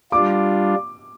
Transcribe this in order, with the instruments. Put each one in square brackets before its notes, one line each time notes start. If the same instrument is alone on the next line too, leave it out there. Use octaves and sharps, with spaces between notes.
[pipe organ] G3 D4 F4 [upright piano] D6